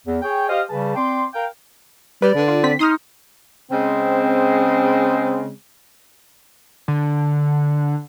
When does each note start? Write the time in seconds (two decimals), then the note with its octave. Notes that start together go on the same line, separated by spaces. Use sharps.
0.06 E2
0.22 G#4 C#5 G5
0.49 G4 C5 D#5 F5
0.69 C#3 G3 G#4 B4 A5
0.95 C4 D5 G5 C6
1.34 A#4 F5 G5
2.22 G3 B4 D5
2.35 D3
2.48 F4
2.63 C4 B6
2.79 D#4 C6 D#6 F6
3.70 C#3 G#3 C4
6.88 D3